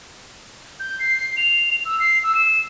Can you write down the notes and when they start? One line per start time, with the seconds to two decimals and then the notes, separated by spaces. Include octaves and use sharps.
0.80 G6
0.99 C7
1.37 F7
1.85 E6
2.00 C7
2.23 E6
2.35 E7